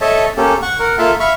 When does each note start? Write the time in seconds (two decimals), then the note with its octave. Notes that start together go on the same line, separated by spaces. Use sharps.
0.01 A4 C#5 D#5 E5 A5
0.37 A#3 C#4 G4 A4
0.62 F#5 C#6
0.79 A#4 F#5
0.99 A#3 F4 A4 E5 F5 A5
1.20 E5 F5 B5 C#6